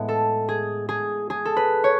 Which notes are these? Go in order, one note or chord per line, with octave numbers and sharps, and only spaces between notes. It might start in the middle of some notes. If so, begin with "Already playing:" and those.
Already playing: A2 G#3 B3
A4
G#4
G#4
G#4
A4
B4
C#5